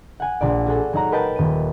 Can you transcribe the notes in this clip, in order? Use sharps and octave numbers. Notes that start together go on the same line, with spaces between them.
F#5 G#5
A#1 A#3 D5
F#4 G#4 A4
F#3 D#4 F#5 A#5
A#4 B4 D#5 G5 A5
D#1 D#7